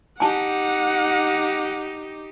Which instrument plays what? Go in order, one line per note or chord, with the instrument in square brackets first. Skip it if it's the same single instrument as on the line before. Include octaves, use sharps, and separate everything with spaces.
[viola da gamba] D#4 G4 [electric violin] F#5 [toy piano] G#5 A5